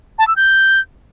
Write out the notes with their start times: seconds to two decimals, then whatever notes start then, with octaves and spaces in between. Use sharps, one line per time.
0.18 A5
0.27 E6
0.36 G6